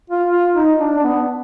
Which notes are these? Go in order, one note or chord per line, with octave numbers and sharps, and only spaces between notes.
F4
F4
D#4
D4
D4
B3